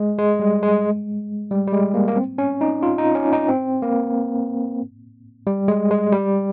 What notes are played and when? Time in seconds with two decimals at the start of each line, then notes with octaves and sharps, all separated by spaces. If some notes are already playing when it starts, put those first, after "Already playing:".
Already playing: G#3
0.18 G#3
0.40 G3
0.63 G#3
1.51 G3
1.67 G3
1.73 G#3
1.94 A#3
2.08 A#3
2.16 C4
2.38 C#4
2.61 D#4
2.83 F4
2.98 D#4
3.15 C#4
3.33 D#4
3.49 C4
3.82 A#3
5.47 G3
5.68 G#3
5.91 G#3
6.12 G3